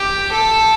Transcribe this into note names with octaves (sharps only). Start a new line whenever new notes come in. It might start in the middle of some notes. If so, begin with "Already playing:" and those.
Already playing: G4
A4